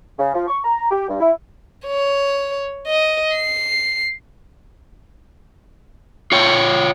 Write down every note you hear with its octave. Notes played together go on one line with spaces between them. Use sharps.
C#3
F3
C#6
A#5
G4
G2
E4
C#5
D#5
C7
F4 C#5 G5